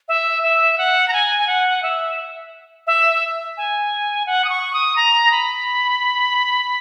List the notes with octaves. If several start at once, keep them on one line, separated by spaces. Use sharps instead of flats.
E5
E5
F#5
A#5
G#5
G#5
F#5
E5
E5
G#5
F#5
D#6
C#6
D#6
A#5
B5